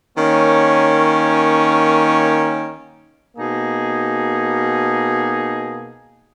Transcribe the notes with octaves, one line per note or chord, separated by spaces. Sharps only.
D#3 A#3 C#4
B2 A#3 D#4 G#4